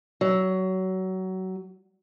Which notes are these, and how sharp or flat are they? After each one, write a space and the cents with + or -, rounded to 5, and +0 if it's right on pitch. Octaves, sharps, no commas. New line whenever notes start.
F#3 +20